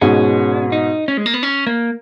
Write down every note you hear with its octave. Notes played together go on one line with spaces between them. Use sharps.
G#2 B2 C#4
D#4
C#4
G#3
A#3
B3
C#4
A#3